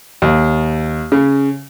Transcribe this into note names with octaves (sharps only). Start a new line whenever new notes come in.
D#2
C#3